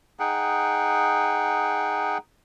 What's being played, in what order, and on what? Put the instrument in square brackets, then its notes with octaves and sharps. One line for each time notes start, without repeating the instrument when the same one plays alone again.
[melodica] D#4 G#4 F#5 G5